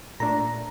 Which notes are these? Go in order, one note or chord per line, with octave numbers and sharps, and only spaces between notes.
A#2 A3 D4 A#5